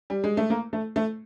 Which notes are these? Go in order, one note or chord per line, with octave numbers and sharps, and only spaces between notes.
G3
G#3
A3
A#3
A3
A3